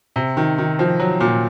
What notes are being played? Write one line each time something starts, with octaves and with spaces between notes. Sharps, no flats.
C3
D#3
D#3
F3
F#3
A#2